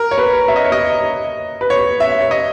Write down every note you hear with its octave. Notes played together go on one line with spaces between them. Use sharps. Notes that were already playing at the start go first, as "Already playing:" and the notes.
Already playing: A#4
C#5
B4
E5
D#5
C#5
D#5
B4
C#5
E5
C#5
D#5